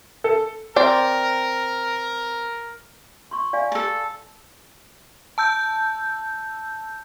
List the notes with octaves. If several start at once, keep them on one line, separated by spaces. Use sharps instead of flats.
A4
C4 A#4 D5
C6 C#6
D5 F5 G#5
A4 A5
A5 E6 G6